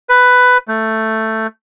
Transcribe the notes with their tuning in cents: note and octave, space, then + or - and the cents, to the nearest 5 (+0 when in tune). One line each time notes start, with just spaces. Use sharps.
B4 +10
A3 +5